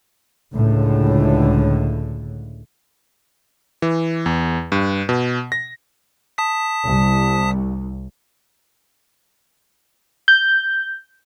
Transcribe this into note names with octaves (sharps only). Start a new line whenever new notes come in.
C#2 A2 D3
E3
E2
G2
B2
A#6
A5 D#6 B6
C2
G6